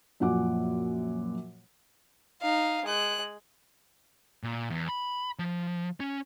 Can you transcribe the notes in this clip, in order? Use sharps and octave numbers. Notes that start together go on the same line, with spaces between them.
F#2 A#2 F3 F#5 G#5 D6
D#4 F5
G#3 F#6
A#2
E2
B5
F3
C#4